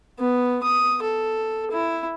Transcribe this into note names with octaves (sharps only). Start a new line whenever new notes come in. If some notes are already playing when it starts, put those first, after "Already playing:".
B3
D#6
A4
E4